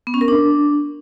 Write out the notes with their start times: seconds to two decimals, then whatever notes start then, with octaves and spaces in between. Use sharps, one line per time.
0.07 B3
0.14 C#4
0.21 A#4
0.28 D4